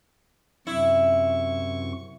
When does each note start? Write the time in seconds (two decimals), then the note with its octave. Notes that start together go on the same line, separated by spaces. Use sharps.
0.67 F#2 C3 E4 C#6